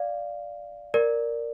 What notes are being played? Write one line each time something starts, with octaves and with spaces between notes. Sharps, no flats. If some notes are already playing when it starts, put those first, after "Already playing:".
Already playing: D5 F5
A#4 D5